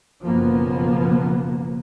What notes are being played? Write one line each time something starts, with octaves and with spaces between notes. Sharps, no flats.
F#1 B2 F3 A#3 B3